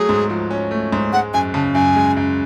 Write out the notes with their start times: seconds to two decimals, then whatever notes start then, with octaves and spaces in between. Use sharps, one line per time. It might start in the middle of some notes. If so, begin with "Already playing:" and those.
Already playing: F#3 A3 G#4
0.09 G#2
0.30 F3
0.51 C#4
0.71 A3
0.93 G#2
1.13 G#3 F#5
1.34 F#2 G#5
1.54 C#3 A5
1.75 F#2 G#5
1.96 G#3
2.17 F#2